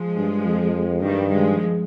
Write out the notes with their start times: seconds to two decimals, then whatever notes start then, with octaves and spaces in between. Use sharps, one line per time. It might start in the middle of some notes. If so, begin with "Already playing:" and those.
Already playing: F3 G#3
0.16 G2
0.46 F2
1.02 G2 D#3 G3
1.31 F3 G#3